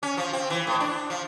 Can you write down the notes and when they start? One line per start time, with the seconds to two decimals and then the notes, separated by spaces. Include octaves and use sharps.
0.03 C#4
0.17 F3
0.33 C4
0.50 E3
0.67 A2
0.80 D4
1.10 F3